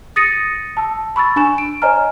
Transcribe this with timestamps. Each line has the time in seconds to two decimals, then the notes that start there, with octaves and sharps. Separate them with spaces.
0.16 D#6 A6 A#6 C#7 D#7
0.77 A5 E6
1.16 B5 C#6 E6 A6
1.36 D4 G#5 C#6 E7
1.58 D7
1.82 C5 C#5 D#5 G#5 A#5 F6